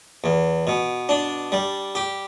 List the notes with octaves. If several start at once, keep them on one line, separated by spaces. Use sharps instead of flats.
E2
B2
D4
G3
G4